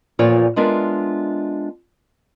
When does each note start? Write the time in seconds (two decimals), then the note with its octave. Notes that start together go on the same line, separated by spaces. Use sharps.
0.19 E2 A#2 F3 F4 C#5 D5
0.56 G#3 B3 D4 F4 A#4 E5